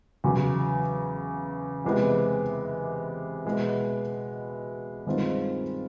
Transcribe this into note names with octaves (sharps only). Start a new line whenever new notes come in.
E2 C#3 F#3
E2 C3 E3 G#3 B3
B2 G#3 B3 E4
G2 D#3 G#3 C4 F4